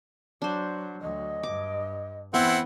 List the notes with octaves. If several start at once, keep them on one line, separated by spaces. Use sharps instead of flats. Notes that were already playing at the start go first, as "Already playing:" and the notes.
F#3 D4 C5
D2 F#3 D#5
G2 D6
E2 B3 C4 E4 F#5